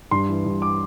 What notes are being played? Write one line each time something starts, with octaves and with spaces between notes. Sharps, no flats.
G2 C6
E3
G2
D6